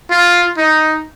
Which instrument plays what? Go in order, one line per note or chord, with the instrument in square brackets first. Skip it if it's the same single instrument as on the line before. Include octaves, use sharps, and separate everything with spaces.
[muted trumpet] F4
D#4